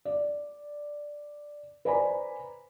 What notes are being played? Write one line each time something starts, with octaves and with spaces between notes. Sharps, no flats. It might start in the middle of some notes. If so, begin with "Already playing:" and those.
D5
B4 C5 D5 G#5 A#5 B5